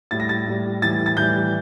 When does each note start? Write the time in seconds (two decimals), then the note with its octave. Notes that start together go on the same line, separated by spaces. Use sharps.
0.11 A2 G3 A6
0.20 A#6
0.29 A6
0.47 A2 G3
0.82 A2 E3 G3 A6
1.06 A6
1.17 A2 E3 G3 G6